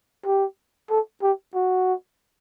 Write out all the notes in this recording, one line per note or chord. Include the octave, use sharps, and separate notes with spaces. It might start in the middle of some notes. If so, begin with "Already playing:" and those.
G4
A4
G4
F#4